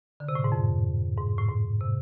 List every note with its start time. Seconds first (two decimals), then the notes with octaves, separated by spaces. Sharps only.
0.20 D3
0.29 C3
0.35 A2
0.44 G#2
0.52 F2
1.17 G#2
1.38 A2
1.48 G#2
1.81 C3